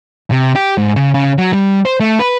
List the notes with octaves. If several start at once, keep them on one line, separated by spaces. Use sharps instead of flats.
C3
G4
G#2
C#3
C#3
F#3
G3
C5
A3
B4